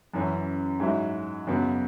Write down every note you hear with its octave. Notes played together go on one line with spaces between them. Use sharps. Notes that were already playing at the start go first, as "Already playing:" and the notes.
F#2 E3 C#4
G#2 F#3 E4
F#2 C#3 F#3 B3